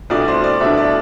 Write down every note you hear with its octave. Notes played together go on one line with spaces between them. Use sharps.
C2 B2 A3 D4 D5
C5
D5
C2 B2 A3 D4 E5
D5